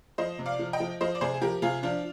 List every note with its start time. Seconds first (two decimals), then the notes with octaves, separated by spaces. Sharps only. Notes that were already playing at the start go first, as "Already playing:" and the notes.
0.18 F3 C5 D#5
0.39 C3
0.46 D5 F5
0.59 F3
0.73 D#5 G5
0.80 F3
1.01 F3 C5 D#5
1.15 D5
1.21 C3 G#4 C5
1.34 G#4
1.42 F3 G4 A#4
1.62 C3 F4 G#4
1.83 F3 D4 F4